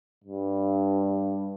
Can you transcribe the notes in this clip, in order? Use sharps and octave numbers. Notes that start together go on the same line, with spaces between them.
G2